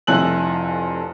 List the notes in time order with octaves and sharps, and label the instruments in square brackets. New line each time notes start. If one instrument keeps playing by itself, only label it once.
[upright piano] F1 F2 E4 G#5 F#6 F#7